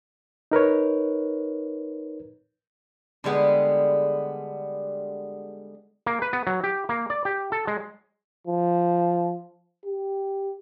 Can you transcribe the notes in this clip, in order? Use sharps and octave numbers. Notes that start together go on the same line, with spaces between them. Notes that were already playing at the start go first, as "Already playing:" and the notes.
D#4 A#4 B4 C#5
D3 G3 G#3 B3
A#3
B4
B3
F#3
G4
A#3
D5
G4
A4
G#3
F3
G4